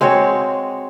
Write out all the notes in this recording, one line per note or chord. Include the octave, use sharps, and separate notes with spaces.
G#3 C4 F#4 C#5